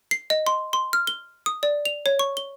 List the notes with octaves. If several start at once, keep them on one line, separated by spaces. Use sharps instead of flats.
C7
D#5
C6
C6
F6
G7
D#6
D5
F7
C#5
C#6
G7